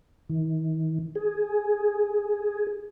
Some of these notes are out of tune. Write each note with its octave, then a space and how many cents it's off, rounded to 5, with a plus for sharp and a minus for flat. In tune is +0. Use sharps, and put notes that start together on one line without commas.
D#3 +45
G#4 +5